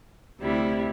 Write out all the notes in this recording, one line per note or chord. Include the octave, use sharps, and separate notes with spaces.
D2 C3 G3 E4